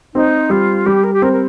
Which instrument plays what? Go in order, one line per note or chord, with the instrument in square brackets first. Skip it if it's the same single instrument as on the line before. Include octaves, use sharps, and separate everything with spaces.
[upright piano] C4 [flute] D#4
[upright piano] G3 [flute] F4
[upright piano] G3 [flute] G4
[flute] A#4
G4
[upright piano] C4 [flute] A#4
[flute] A#4